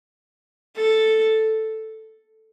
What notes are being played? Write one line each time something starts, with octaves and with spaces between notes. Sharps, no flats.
A4